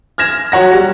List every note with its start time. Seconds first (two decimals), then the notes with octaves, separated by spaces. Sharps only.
0.18 F6 G#6 A#6 E7
0.52 F#3 C#5 F#5 A#6
0.73 G3